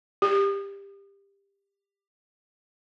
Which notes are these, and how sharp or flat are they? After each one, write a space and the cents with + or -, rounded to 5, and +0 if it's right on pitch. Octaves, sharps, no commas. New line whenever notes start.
G4 +20